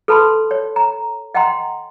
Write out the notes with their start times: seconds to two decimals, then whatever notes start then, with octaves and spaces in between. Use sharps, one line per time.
0.08 A4 B4 A5 B5 C6
0.51 C#5
0.76 A#5
1.34 D#5 F#5 G5 A#5 C6